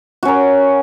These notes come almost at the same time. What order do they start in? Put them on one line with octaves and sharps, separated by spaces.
F#4 C#4 A#4